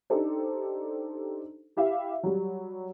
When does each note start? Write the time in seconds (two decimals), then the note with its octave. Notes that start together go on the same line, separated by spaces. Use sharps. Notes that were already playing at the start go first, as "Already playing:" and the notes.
0.10 D4 D#4 G4 A4 C5
1.77 E4 G4 E5 F5
2.23 F#3 G3